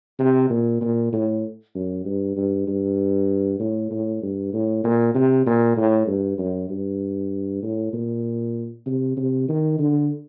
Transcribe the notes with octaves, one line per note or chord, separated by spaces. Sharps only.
C3
A#2
A#2
A2
F#2
G2
G2
G2
A2
A2
G2
A2
A#2
C3
A#2
A2
G2
F#2
G2
A2
A#2
C3
C3
D#3
D3